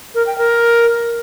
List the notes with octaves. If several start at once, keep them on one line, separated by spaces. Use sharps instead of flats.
A#4
G5
A#4